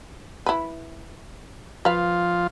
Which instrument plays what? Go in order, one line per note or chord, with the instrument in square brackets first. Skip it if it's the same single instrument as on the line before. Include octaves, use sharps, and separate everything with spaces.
[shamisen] E4 B4
[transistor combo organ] F3 F4 [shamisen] B4 F5